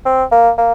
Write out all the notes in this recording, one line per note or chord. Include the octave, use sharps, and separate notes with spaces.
C4
A#3
A#3